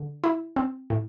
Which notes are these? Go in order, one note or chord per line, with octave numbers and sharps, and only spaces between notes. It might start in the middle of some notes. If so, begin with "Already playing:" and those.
Already playing: D3
E4
C4
A2